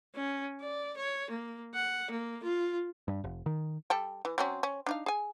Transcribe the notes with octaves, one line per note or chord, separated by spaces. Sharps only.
C#4
D5
C#5
A#3
F#5
A#3
F4
G2
F1
D#3
G3 A4 G5
E3
F#3 C4 C#4
C#4
D4 D#4 F5
G#4 G#5